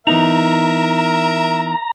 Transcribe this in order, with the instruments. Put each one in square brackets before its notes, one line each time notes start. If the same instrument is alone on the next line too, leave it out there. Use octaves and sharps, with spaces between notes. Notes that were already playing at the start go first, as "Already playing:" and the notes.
[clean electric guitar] E3 B3 D#4 [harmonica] A#4 E5 [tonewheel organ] A#5